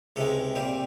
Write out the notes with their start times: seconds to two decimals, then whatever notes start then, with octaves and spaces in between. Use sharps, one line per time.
0.16 C#2 C3 D#3 G#3 A4
0.55 A#2 G3 C4